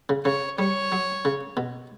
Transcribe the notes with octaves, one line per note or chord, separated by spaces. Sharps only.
C#3
C#3 C#5
G3 C#5
F#3
C#3
B2